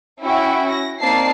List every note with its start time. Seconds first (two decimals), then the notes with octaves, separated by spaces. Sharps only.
0.22 C#4 E4 F#4 G5
0.71 A#6
1.00 A#3 C4 D#4 D5 A5 C7